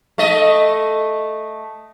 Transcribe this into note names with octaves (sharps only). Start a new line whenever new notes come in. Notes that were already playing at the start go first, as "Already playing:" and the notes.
A3 D#5